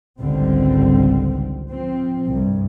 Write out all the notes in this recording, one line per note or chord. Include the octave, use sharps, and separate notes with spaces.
G#1 C#2 D3 G3 C4
F3 C4
C2 G2